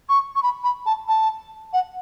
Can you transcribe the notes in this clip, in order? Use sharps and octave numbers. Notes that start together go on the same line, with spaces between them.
C#6
C#6
B5
B5
A5
A5
F#5